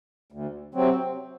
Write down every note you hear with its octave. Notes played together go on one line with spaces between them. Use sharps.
D2
C3 F#3 C4